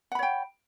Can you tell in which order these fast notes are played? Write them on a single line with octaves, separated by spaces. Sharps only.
F#5 B5 C#5 G5